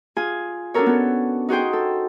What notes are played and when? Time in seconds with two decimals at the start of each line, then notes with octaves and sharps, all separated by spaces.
0.17 F4 G#4 G#5
0.74 C#4 D4 F#4 A4 A#4 C#5
0.86 B3 A4
1.49 D#4 F#4 G#4 C5 G5
1.73 A4